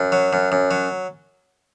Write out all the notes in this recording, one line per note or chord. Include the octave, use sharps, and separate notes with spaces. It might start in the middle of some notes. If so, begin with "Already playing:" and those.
Already playing: F#2
F#3
F#2
F#2
F#3